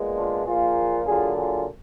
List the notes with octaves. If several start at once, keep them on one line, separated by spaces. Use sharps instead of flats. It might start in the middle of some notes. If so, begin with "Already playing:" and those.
Already playing: A#2 G#3 B3
D4 F4
A#2 F3 A#3 F4 G#4
D3 F#3 A#3 F4 G#4
F4 G#4